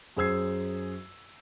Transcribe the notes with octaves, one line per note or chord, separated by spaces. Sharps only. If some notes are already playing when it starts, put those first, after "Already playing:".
F#2 G#4 C5 E6 G#6 C7